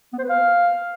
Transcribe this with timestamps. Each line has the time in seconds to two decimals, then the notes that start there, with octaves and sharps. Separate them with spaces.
0.13 B3
0.19 C5
0.24 B4
0.29 F5